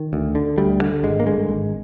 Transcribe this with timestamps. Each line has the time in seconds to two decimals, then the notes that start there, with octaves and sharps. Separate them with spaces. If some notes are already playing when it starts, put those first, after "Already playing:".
Already playing: D#3
0.13 D2
0.35 D3
0.58 D2 G3
0.81 D3
1.03 G#1 G#3
1.20 A#3
1.26 G2 D3 G#3
1.49 G#1